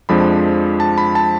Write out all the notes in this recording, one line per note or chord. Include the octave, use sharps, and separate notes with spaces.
F2 F3 G#3 D4 B5
A5
B5
A5